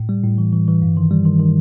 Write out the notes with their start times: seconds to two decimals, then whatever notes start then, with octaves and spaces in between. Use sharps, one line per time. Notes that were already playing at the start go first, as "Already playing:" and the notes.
Already playing: A2
0.09 G3
0.23 A2
0.38 E3
0.53 E3
0.68 E3
0.82 G2
0.97 D#3
1.11 G3
1.25 D#3
1.40 D#3